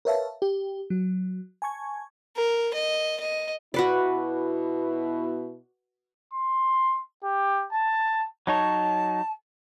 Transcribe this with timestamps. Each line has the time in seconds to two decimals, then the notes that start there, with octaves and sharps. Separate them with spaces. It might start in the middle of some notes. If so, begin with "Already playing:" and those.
0.05 A#4 B4 C#5 E5 F5 A5
0.42 G4
0.90 F#3
1.62 G#5 A5 C#6 G#6
2.37 A#4
2.73 D#5
3.20 D#5
3.74 B2 E4 F#4 B4 D5
6.33 C6
7.24 G4
7.73 A5
8.47 F#3 D#4 C#5 A5